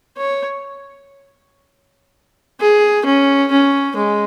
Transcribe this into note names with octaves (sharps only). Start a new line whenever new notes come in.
C#5
G#4
C#4
C#4
G#3